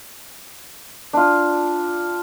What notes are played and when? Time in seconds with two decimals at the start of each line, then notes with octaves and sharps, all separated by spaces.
1.13 D4 F4